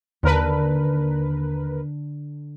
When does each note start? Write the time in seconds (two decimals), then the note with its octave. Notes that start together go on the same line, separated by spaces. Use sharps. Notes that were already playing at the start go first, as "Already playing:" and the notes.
0.23 D#2 D3 A#4 B4